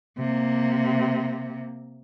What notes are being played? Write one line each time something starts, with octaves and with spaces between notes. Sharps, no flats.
C3 A#3